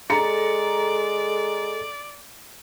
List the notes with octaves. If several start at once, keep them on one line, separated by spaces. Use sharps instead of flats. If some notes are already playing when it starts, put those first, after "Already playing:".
G#3 A4 D5 A#5 C#7